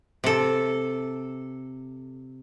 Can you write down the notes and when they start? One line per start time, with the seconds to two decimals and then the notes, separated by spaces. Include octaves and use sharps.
0.24 C3 A4